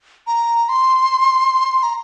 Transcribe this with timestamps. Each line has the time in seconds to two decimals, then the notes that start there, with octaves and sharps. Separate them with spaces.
0.27 A#5
0.69 C6
1.83 A#5